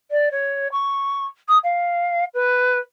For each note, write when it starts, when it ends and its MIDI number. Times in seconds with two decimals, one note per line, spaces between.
0.11 0.29 74
0.31 0.68 73
0.72 1.26 85
1.48 1.58 87
1.64 2.24 77
2.34 2.79 71